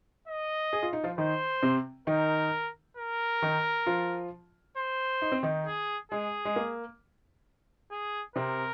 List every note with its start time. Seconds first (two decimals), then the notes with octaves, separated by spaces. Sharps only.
0.28 D#5
0.73 G#4
0.83 F4
0.93 D#4
1.04 F3 F4
1.18 D#3 D#4 C5
1.63 C3 C4
2.07 D#3 D#4 A#4
2.97 A#4
3.42 D#3 D#4
3.86 F3 F4
4.77 C5
5.22 D#4
5.32 C4
5.43 D#3 D#4
5.66 G#4
6.12 G#3 G#4
6.45 G#3
6.56 A#3
7.91 G#4
8.36 C3 C4 A#4